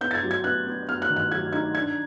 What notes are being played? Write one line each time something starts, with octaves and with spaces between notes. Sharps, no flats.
B3 G6
A6
G#6
F#3
G#6
B3 F#6
B3
B3 F6
F#6
D#3
F#6
F#3 G#6
D#4 G#6
D4 G#6